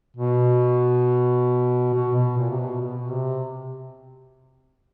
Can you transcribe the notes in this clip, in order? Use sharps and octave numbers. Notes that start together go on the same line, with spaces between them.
B2
B2
B2
A#2
C3
B2
B2
C3